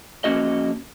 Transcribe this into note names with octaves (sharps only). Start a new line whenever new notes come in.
F2 A#3 C#4 F#4 D#5